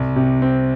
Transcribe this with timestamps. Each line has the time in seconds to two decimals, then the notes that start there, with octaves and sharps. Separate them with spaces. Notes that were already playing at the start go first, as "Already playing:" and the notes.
Already playing: C2
0.16 C3
0.42 C4